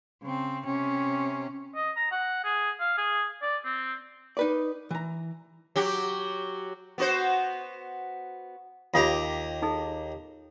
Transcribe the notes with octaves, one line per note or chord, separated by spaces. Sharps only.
C#3 C4
C3 C#4
D#5
A#5
F#5
G#4
F5
G#4
D5
C4
D#4 B4 D5
E3 A#5
F#3 G4
B3 F#4 C5
D#2 F4 G4 F5 A#5 D#6
D#4 G#4 A4